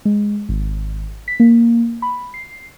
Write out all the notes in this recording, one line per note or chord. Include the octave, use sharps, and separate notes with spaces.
G#3
G#1
B6
A#3
B5
C7